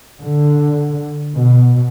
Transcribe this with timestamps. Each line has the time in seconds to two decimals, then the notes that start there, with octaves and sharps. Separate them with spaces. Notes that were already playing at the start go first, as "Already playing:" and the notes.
0.21 D3
1.35 B2